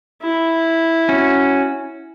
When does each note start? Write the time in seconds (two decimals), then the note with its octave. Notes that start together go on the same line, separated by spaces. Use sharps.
0.22 E4
1.09 C#4 F#4